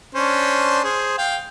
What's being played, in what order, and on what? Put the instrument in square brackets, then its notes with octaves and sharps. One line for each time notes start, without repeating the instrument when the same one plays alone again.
[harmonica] C#4 D4 C5
G#4 C5
F5 G5